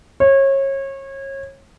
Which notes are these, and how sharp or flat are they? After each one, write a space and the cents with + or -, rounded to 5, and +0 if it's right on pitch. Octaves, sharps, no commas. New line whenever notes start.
C#5 -30